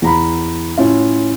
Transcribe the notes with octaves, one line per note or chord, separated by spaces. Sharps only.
E2 A#5 B5
A2 C#4 F4